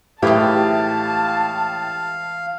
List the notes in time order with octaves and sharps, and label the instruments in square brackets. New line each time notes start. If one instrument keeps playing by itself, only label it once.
[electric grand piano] A2 E4 G4 [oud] E3 G#3 D#4 [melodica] F5 [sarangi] A5